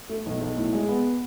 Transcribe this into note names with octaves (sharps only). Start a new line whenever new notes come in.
A3
B1
B1
A2
G#3
B3